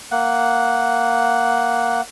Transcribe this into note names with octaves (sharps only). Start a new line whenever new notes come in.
A#3 F#5